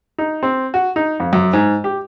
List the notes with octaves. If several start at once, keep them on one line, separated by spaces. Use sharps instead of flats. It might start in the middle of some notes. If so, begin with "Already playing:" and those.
D#4
C4
F#4
D#4
F2
F#2
G#2
G4